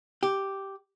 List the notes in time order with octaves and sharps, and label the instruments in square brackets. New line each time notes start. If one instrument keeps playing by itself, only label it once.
[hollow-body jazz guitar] G4